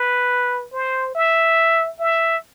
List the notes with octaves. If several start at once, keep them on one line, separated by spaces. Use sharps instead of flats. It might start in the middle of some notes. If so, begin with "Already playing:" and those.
Already playing: B4
C5
E5
E5